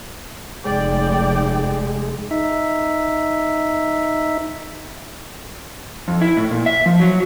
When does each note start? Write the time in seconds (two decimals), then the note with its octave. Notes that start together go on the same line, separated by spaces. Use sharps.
0.65 F1 G#3 D5 G5
2.31 D#4 E5
6.08 F2
6.21 E4
6.37 A2
6.51 A#2
6.66 E5
6.86 F3
7.00 F#3